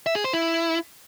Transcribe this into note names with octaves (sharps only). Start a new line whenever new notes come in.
E5
G#4
C5
E4